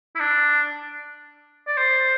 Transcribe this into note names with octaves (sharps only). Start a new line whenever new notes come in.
E4
D4
D5
C5